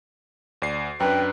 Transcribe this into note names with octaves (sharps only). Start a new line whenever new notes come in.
D2 D5 C7
F#2 D4 B4 G5